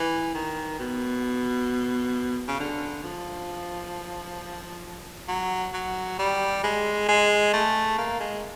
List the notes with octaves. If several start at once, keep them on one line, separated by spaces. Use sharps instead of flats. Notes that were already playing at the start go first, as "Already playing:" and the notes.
Already playing: E3
D#3
B2
C#3
D3
F3
F#3
F#3
G3
G#3
G#3
A3
A#3
G#3